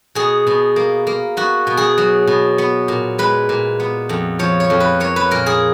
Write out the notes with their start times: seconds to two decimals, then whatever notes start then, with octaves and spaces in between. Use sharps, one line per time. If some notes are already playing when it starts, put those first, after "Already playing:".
0.15 B2 G#4
0.47 B2
0.76 A#3
1.07 A#3
1.37 B3 F#4
1.67 B2
1.77 G#4
1.98 F#3
2.27 B2
2.58 B3
2.88 A#2
3.18 G#3 B4
3.49 A#2
3.80 B3
4.09 F2
4.39 F3 C#5
4.60 C#5
4.70 F2
4.80 B4
5.00 A#3 C#5
5.16 B4
5.31 A#2 A#4
5.46 G#4